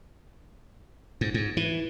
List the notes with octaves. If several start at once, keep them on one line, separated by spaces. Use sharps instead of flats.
G#2
G#2
E3